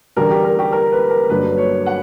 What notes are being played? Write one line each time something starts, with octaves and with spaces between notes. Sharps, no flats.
E2 D3 G3 A#4
G4
A#4
G4
A#4
B4
A#4
G1 G2 D3 F#3 A#3 B4
C#5
F#5